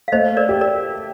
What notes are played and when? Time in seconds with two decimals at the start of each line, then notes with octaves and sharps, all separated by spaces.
0.08 F5
0.12 A3 C5 D#5
0.37 A#4 D5
0.49 G4
0.61 A#4 D5